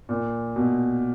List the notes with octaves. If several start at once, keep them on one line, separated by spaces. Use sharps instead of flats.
A#2
B2